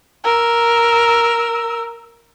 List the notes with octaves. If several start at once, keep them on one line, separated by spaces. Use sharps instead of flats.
A#4 E6